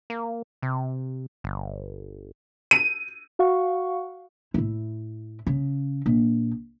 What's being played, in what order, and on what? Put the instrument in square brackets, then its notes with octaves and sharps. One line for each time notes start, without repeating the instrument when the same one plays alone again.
[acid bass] A#3
C3
G1
[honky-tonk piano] D#7
[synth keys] F#4 F5 F#5 C#6
[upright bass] A2 E4
C#3
A#1